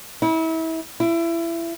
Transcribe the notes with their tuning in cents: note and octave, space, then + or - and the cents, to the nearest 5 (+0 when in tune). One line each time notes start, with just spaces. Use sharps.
E4 -30
E4 +25